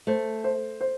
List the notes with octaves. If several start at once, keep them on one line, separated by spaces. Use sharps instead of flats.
A3 C5
C5
C5